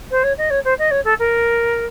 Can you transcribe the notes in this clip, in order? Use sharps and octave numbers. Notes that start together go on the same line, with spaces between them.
C5
C#5
D#5
C#5
C5
D#5
C#5
A4
A#4